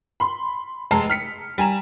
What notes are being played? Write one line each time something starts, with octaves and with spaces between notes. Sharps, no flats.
B5 C6
F1 G#3 A5 A#5 C7
F6 B6 C#7
G3 G#5 A#5 E7